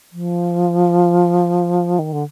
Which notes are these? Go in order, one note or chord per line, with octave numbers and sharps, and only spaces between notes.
F3
D#3
D3